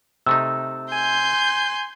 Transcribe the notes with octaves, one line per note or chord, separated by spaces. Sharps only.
C3 A3 D#4 E6
G#5 C6 G6